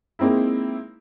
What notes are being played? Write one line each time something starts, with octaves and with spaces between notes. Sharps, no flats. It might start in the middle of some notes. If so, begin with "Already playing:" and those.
G#3 A#3 C4 D#4 E4